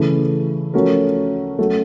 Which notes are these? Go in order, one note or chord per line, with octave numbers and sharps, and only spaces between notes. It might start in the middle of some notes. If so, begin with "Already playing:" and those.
Already playing: C#3 E3 A3
F3 A3 C#4 F#4 A#4
F#3 A3 C#4 F#4 A4